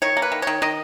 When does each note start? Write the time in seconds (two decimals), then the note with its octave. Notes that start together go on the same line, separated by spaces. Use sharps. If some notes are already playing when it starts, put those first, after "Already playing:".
0.02 D#3 C#5
0.17 A#3
0.22 B4
0.32 D#3
0.42 D#3 C#5
0.62 D#3 D#5